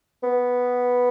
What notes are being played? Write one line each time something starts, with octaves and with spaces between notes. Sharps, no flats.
B3